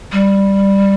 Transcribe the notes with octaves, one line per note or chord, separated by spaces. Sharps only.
G3